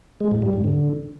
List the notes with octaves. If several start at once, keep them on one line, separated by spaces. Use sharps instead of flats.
G#3
A2
G3
G#2
D3